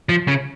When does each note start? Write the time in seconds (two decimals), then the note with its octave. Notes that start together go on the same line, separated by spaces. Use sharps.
0.09 F3
0.28 C#3